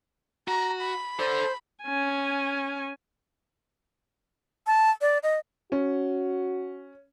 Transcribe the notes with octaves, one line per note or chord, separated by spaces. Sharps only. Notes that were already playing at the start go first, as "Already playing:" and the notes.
F#4 A#5
B5
A4 C5 D5
C#4 G#5
A5
D5
D#5
C#4 F#4